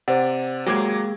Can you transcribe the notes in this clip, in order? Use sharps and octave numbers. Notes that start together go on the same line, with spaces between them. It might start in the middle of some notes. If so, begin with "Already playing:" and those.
C3 C5 D5 F#5
F#3 G#3 A#3 G4 D6 G#6